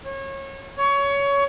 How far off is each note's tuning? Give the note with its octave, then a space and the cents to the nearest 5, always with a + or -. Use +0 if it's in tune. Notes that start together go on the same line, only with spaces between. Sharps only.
C#5 -30
C#5 +20